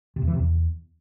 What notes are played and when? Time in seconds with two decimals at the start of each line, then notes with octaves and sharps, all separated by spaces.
0.16 C3
0.22 E2
0.28 E3
0.33 C3
0.39 E2